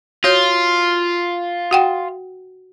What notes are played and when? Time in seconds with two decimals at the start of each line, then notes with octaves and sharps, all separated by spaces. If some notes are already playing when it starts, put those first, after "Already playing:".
0.24 F4 F#4 C#5 G6
1.71 F#4 F#5 G5